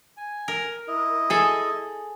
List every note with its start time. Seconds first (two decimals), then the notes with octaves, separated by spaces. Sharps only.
0.17 G#5
0.48 A#4
0.88 E4 D#5
1.30 G#4 A4